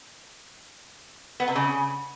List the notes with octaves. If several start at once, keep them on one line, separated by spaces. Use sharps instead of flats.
B3
C3
C#3